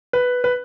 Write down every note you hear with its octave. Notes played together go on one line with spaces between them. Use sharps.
B4
B4